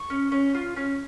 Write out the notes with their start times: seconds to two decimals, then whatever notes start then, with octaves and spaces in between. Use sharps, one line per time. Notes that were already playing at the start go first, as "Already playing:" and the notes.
Already playing: C#6
0.10 C#4
0.32 C#4
0.55 F4
0.76 C#4